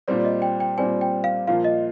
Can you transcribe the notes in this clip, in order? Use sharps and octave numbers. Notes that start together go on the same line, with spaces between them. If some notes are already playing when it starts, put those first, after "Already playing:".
A#2 G3 C4 D5
D#5
G5
G5
A#2 G3 C4 G#5
G5
F5
A#2 F3 A#3 F4 F5
D#5